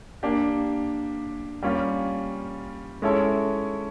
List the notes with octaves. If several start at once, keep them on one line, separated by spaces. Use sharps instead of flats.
A#3 D4 G4
G3 A#3 C#4 F4
G#3 C#4 E4 A4 C#5